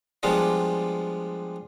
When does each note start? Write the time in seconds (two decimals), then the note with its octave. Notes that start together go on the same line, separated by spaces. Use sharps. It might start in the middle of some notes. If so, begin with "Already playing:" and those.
0.23 F3 G3 G#3 B3 D4 F4